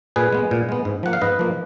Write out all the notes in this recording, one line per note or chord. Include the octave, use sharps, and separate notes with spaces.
A#2 G#4 B4
G#3 B3
A#2
G#3 B3
G#2
F3 A#3 F#5
F5
G#2 B4 D#5
F3 A#3